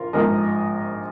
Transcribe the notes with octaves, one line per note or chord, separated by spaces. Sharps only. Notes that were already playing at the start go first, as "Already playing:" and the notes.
Already playing: A#1 F3 F4 A#4
A#1 G#2 F3 A#4 D#5